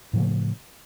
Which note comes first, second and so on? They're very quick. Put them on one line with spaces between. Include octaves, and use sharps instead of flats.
A2 F3 C#3 A3